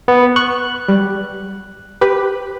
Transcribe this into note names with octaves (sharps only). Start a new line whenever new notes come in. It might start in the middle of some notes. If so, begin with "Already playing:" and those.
B3
C#6 F#6
G3
G4 B4